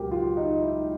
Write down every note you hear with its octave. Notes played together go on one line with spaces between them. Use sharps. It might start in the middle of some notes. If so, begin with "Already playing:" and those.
Already playing: C#2 B2 F#3 A#3 G4 A#4 B4
F4
D#4
E4